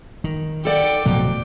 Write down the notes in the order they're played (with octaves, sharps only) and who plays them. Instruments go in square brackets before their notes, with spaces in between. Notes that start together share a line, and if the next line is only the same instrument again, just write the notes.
[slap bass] D#3
[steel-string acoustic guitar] A4 D5 F#5 [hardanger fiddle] G5 D6
[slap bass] D1 B2 A3 [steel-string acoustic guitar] F3 F#3